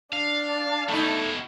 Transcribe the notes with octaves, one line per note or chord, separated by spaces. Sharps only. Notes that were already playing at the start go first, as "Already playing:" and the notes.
D4 F5 A5
B2 A3 D#4 E4